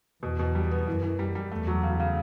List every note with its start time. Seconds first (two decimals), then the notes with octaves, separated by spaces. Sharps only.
0.23 E2 B2
0.39 B2
0.55 G3
0.71 B3
0.87 F#2 E3
1.03 E3
1.19 G3
1.35 G3
1.51 E2 A3
1.67 F#3
1.83 C#3
2.00 C#3